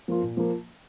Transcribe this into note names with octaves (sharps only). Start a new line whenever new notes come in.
F3 A#3 F4
A#2
F3 A#3